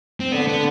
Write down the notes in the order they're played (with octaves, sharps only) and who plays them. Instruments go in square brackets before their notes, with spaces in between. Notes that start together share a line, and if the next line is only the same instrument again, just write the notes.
[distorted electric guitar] C4
[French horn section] D3 [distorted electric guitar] B3
[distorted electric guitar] B3